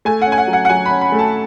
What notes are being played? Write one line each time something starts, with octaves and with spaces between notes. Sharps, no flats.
A3 G#5
C#4 F#5
G#5
F#5
F#3
F#5
F#5
F#3 G#5
B5
C#4
B5
A3
A5